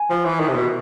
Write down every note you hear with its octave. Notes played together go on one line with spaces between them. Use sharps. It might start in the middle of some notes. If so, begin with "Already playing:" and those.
Already playing: G#5
F3
E3
D#3
C3
B2